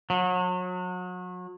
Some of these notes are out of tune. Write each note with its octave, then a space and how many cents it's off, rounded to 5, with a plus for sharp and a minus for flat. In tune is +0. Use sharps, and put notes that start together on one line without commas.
F#3 -35